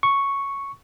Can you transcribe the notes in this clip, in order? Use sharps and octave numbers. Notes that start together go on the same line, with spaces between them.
C#6